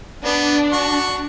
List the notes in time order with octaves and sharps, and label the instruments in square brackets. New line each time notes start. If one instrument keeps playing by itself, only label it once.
[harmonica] B3 [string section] D4
[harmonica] F#4 C#6